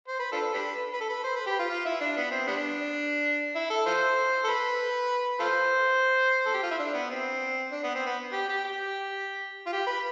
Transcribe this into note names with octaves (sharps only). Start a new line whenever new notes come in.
C5
B4
D4 F4 A4
D4 G4 B4
B4
A4
B4
C5
B4
G4
F4
F4
E4
D4
B3
C4
G3 B3 D4
E4
A4
F4 A4 C5
A4
B4
F4 A4 C5
A4
G4
F4
E4
D4
B3
C4
D4
B3
C4
B3
G4
G4
G4
F4
G4
B4